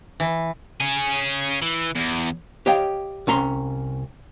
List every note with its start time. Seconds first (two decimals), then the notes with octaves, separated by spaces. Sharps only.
0.20 E3
0.80 C#4 G#4
1.62 E3
1.95 E2
2.66 G4 C#5 D#5 F5 G5
3.27 C2 C#4 A#5 C6